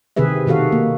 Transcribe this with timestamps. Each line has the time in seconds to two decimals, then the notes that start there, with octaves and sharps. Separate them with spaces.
0.16 C3 D#3 C4 G#4 B4 E5
0.46 B2 D#3 F#4 A4 F5
0.72 A#3